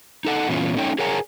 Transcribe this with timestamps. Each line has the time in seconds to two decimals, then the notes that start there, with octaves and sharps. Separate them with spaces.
0.25 D#4 A4 F#5
0.49 A#2 E3 B3 C#4 F4
0.77 A3 C#4 D#4 C#5 G5
0.99 G#4 A#4 C#5 F#5 G#5 A#5